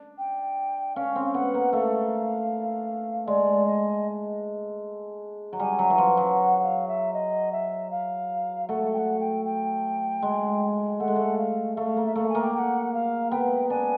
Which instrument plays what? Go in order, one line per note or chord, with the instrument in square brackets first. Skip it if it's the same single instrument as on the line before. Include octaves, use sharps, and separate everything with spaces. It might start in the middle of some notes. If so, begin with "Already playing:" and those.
Already playing: [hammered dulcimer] D4
[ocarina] G5
[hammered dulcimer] C#4 [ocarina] F5
[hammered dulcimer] C4
[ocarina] F5
[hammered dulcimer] B3 [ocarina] F#5
[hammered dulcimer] A#3
[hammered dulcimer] A3 [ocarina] F5
[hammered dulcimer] G#3 [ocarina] D5
[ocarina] D#5
[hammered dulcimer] F#3
[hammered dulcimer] G3 [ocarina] G#5
[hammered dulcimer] F#3
E3
F3
F#3
[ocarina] F#5
F5
E5
D#5
E5
F5
[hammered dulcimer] A3 [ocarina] F#5
[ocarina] G5
F#5
G5
G5
[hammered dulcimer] G#3
[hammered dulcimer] A3 [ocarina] F#5
[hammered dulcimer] G#3
A3
[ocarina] F5
[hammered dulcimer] A3 [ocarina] F5
[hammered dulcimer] A#3
[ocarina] E5
[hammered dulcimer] A3 [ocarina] F5
[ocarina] G#5
[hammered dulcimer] A#3
[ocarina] G5
G5
F#5
F5
[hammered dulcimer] B3 [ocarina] G5
[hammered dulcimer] D4 [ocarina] G#5